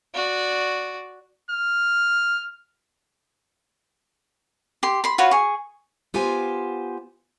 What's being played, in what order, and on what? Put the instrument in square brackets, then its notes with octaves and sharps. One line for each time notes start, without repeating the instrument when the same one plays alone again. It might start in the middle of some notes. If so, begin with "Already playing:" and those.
[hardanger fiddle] F#4 D5
[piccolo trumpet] F6
[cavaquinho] G4 C6
B5 C6
F4 F#4 B4 C#5
G#4 C#6
[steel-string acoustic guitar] B3 F4 G4 C5 G#5